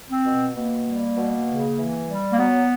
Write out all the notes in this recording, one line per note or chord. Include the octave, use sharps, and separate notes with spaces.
C4
B2
B2 A#3
G3
B2
C#3
E3
G3
A#3
F#3 B3